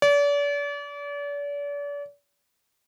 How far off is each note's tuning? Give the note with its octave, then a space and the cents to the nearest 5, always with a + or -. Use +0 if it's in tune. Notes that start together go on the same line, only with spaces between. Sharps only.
D5 -40